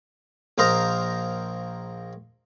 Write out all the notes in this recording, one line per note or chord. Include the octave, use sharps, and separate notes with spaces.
A#1 A#3 A#4 C5 D#5 A#5